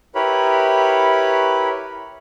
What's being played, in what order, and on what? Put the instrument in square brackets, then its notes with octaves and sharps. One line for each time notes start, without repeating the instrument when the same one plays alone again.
[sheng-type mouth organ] E4 G4 A#4 B4 C#5 B5